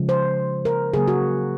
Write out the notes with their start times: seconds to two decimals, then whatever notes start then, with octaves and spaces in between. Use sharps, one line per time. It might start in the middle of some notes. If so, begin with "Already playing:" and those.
Already playing: C#3 F3 G#3
0.09 C5
0.65 A#4
0.94 C#3 F#3 A#3 G#4
1.08 F#4